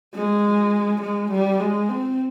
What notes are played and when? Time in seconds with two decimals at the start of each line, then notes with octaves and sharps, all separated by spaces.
0.14 G#3
1.02 G#3
1.31 G3
1.60 G#3
1.89 C4